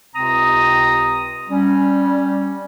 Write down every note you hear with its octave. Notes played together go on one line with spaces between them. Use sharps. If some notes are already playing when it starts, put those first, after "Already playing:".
C#2 C3 C4 A#5 D#6
G3 C#4